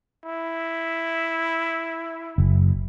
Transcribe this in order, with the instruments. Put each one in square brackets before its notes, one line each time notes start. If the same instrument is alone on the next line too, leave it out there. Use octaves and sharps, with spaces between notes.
[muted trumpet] E4
[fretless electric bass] F#1